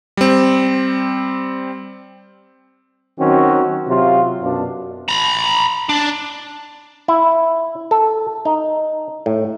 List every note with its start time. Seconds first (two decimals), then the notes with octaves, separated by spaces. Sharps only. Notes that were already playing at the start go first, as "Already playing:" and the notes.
0.17 G3 C4
3.19 D#3 F#3 C4 C#4 F#4
3.88 C3 F#3 F4
4.42 F#2 B2 D4
5.08 A#5 B5
5.89 D4
7.08 E4
7.91 A4
8.45 D#4
9.26 A2